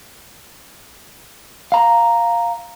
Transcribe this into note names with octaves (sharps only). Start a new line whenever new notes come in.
F5 A#5